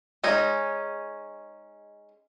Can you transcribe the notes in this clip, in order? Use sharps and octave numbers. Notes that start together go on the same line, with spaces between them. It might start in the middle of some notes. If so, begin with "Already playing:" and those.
G#3 C#4 D#4